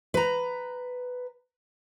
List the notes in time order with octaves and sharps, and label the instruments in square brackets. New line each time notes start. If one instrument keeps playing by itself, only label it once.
[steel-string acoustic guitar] B4 A#5